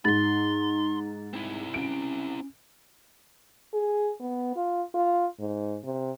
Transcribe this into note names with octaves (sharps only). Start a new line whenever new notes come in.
G#2 D#4 B5 C6 A6
C4 E4
C#4 D7
G#4
B3
F4
F4
G#2
C3